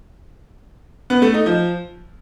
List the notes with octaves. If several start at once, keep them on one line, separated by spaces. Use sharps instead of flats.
B3
A3
D#4
F3